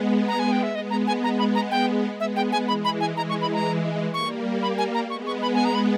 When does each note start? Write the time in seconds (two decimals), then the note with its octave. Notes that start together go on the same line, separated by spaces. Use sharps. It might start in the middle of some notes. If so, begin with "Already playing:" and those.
Already playing: G#3 B3
0.28 A#5
0.39 G#5
0.52 G5
0.63 E5
0.75 G#3 B3 D#5
0.90 A#5
1.07 G#5
1.24 A#5
1.39 B5
1.55 A#5
1.71 G5
2.20 G#3 B3 E5
2.36 G5
2.52 G#5
2.68 E3 G#3 B5
2.85 B5
3.00 G#5
3.17 E3 G#3 A#5
3.29 C#6
3.42 B5
3.53 A#5
4.14 G3 A#3 C#6
4.62 B5
4.78 G#5
4.94 A#5
5.10 G#3 B3 C#6
5.27 C#6
5.42 B5
5.55 G#5
5.65 A#5
5.75 B5